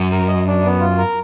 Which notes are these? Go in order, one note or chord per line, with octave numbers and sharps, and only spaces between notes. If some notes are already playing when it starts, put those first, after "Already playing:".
Already playing: F#2
A#4
D#5
D4
B3
F4
A#4